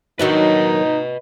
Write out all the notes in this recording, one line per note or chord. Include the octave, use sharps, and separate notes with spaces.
D#3 F#3 D4 D#4 B4 D#5